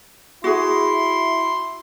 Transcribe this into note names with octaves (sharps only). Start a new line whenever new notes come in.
E4 F#4 G#4 C6